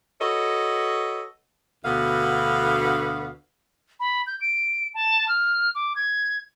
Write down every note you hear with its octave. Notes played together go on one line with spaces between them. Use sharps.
F#4 A4 B4 C#5 D#5
D2 B2 D3 B3 F#4 F5
B5
G6
D7
A5
F6
D6
G#6